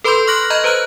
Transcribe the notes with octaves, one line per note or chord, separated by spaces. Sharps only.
A4 B4 B5 C6 D6 G6
C#6 F6 F#6 A#6 F#7
D#5 A#5 B5 F6 G6
B4 C5 A#5 F#6